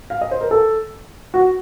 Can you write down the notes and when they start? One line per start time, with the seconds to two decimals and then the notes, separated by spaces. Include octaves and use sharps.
0.10 F5
0.21 D#5
0.31 C5
0.41 A#4
0.51 A4
1.34 F#4